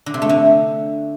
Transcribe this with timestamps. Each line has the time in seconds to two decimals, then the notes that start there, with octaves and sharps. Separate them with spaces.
0.06 D3
0.14 C3
0.22 A3
0.29 D3